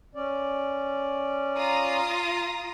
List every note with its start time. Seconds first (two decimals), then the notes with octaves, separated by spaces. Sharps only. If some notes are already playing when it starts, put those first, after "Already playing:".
0.15 C#4 D5
1.56 F4 A#5 D#6